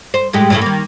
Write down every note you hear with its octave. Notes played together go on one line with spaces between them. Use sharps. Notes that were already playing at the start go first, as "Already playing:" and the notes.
C5
A2 G#3 G4
A2 C#3 A3
D#3 A#3